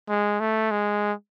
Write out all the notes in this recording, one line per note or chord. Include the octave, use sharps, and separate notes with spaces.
G#3
A3
G#3